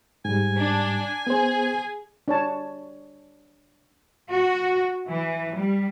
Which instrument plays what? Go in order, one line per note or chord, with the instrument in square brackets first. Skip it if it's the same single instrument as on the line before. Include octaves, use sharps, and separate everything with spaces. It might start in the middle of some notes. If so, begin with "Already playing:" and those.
[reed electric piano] G#2 G3 [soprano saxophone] G#5
[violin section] D4
[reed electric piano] B3 C5 [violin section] G#4
[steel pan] D4 C#5 A5
[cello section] F#4
E3
G3